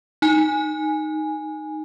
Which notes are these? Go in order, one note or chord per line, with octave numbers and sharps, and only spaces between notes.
D#4 G#5